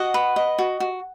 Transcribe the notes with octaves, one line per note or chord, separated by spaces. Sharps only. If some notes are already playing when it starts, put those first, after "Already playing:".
Already playing: F#4 D#5 F#5
B4
D#5
F#4
F#4